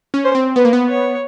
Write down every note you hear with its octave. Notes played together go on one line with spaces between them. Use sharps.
C#4
C5
C4
B3 B4
A#3
B3
C#5